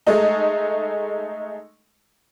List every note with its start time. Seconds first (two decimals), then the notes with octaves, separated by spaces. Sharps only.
0.07 G#3 A3 D#4